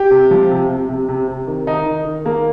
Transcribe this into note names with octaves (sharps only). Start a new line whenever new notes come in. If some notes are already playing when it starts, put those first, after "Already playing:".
Already playing: G4
C3
F3
C3
C3
C3
C3
C3
D#3
D#3 D#4
D#3
D#3
D#3 A#3